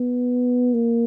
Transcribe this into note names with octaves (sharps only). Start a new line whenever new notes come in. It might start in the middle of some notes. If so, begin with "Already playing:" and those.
Already playing: B3
A#3